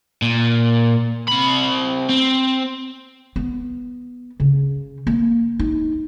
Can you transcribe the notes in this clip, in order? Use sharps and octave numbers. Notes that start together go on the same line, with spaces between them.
A#2
C3 B5
C4
B3
C#3
A#3
D#4